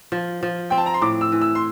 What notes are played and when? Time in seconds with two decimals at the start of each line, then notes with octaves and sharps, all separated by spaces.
0.12 F3
0.43 F3
0.70 C4 G5
0.78 A5
0.86 A#5
0.94 C6
1.02 A2 D6
1.21 E6
1.32 E3
1.42 E6
1.55 C6